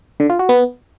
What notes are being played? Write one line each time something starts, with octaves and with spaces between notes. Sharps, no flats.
D3
F4
F#4
B3